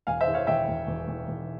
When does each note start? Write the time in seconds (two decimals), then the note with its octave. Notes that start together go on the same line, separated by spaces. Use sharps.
0.07 E1 F5 G#5
0.20 C5 E5
0.27 E2
0.34 C#5 F5
0.47 E1 E5 G5
0.68 E1
0.87 E1
1.08 E1
1.28 E1